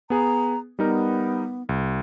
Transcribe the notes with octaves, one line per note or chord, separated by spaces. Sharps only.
B3 G#4 A#5
G3 B3 D#4 A#4
C2